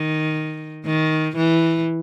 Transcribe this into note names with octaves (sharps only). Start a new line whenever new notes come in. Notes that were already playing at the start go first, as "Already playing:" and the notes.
Already playing: D#3
D#3
E3